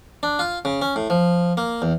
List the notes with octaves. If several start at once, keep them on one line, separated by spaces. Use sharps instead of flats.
D4
F4
C#3
C#4
A2
F3
A#3
E2